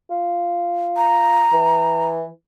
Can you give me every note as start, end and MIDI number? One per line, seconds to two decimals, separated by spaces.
0.10 1.45 65
0.97 2.07 82
1.53 2.26 52